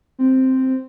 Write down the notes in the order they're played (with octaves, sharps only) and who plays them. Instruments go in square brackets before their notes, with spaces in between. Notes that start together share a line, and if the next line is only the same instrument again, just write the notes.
[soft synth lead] C4